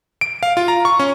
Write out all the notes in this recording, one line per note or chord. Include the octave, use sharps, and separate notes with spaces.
D7
F5
F4
A#5
C#6
C#4